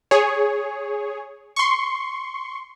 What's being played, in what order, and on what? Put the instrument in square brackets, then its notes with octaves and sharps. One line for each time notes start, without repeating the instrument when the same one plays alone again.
[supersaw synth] G#4 C#5
C6 C#6